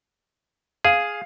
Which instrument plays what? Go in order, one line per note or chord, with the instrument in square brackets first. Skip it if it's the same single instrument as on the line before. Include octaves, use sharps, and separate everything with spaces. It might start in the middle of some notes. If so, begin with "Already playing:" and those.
[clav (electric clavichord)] G#4 [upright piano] F5